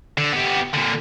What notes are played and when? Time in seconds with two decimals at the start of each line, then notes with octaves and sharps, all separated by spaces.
0.18 D3
0.33 B3 G4
0.74 A#2 D3